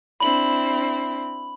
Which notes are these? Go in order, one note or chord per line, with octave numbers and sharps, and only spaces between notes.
C4 D4 E4 B5 F#7